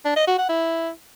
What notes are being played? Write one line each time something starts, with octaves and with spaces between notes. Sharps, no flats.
D4
D#5
F#4
F#5
E4